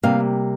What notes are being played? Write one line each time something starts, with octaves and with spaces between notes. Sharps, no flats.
C3 G3 A#3 F5